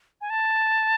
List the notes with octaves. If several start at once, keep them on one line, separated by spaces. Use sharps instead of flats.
G#5
A5